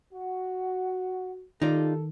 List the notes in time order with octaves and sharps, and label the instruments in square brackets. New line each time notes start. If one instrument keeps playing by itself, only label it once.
[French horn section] F#4 [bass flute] F#5
[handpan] D#3 [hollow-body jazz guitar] D#4 F4 D5 [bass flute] G4 [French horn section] A4